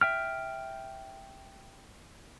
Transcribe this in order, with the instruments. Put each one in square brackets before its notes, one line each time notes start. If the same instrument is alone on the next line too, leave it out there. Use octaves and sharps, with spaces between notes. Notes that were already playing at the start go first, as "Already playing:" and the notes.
[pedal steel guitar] E5 G5 F6